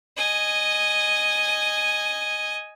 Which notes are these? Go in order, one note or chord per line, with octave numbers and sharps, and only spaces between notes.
D#5 G#5